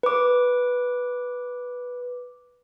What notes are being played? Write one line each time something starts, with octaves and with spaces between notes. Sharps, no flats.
B4 D6